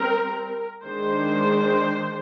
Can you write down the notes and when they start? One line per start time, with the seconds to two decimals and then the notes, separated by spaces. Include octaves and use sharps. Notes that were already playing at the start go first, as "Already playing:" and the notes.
Already playing: G3 C4 A#4
0.83 D#3 G#3 D4 C5